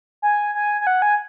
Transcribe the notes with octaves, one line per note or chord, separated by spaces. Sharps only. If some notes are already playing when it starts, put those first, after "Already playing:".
G#5
G#5
G#5
F#5
G#5